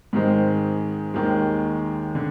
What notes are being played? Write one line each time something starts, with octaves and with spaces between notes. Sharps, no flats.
G#2 D#3 G#3 C4
D#2 D#3 G#3
D3